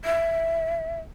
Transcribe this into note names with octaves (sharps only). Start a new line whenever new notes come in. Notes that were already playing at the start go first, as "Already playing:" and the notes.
E5